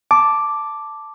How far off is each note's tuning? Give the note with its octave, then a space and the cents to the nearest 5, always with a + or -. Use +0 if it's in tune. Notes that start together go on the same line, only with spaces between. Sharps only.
A5 +0 D6 +0